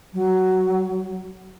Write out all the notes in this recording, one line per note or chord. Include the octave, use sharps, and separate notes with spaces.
F#3